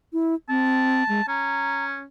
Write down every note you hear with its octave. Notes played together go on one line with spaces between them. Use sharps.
E4
C4 A5
G#3
C#4 A#5